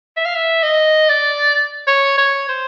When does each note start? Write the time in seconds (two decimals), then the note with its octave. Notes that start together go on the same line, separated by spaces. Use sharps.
0.17 E5
0.25 F5
0.35 E5
0.63 D#5
1.09 D5
1.87 C#5
2.18 C#5
2.48 C5